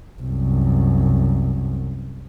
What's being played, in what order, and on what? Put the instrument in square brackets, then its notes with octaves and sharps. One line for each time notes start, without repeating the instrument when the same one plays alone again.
[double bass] C2 F#2